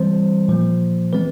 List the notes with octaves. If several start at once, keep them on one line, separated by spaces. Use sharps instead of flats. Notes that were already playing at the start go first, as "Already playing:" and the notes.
Already playing: E3 G3 C4 C5
A#2 F3 A#3
E3 G#3 C4 B4